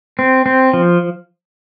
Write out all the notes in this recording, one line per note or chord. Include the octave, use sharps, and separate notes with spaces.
C4
C4
F3